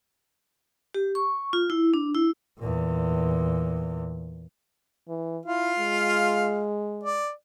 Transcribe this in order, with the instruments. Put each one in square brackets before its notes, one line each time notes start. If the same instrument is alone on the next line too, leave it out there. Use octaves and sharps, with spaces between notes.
[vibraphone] G4
C#6
F4
E4
D4
E4
[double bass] E2 A#2
[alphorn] E3
[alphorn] E4 [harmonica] F4 F5
[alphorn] G#3
[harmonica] D5